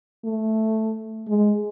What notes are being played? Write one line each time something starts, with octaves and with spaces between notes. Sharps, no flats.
A3
G#3